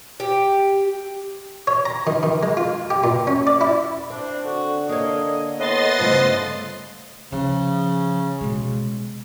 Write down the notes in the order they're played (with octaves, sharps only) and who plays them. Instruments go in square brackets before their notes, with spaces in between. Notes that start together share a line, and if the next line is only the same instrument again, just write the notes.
[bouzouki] G4
[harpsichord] C#5
A#5
D#3
D#3
G#3
F4
G4
A#2
C#4
D5
E4
[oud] C4 [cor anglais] D4
[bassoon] D3 [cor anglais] F#4
[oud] A#3 C#5 [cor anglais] D#5
[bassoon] A2 [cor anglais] B3 [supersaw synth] D#5 C6 A6
[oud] G2 C#3 A3 [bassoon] F3
[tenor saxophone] C#3 [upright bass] F3
[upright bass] B2 G#3